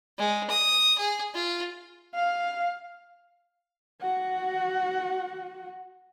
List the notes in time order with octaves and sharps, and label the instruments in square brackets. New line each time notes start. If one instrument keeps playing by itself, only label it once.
[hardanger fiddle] G#3
D#6
G#4
F4
[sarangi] F5
[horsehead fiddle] F#4 F#5